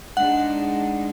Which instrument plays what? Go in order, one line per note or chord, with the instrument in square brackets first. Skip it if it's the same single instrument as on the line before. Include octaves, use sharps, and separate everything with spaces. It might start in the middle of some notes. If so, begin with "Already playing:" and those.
[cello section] G#3 D4 D#4 [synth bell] F#5